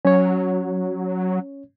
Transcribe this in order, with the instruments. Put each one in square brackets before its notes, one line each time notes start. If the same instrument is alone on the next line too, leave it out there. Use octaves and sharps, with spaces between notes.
[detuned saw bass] F#3 [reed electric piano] C#4 C#5